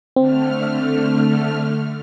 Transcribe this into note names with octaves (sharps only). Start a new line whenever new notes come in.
D3 A3 C4 F6